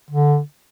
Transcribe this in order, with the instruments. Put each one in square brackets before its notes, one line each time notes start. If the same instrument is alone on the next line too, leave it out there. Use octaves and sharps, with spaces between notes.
[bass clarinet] D3